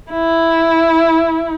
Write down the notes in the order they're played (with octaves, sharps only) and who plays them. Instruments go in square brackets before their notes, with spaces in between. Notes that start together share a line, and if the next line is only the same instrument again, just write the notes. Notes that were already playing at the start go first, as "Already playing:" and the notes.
[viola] E4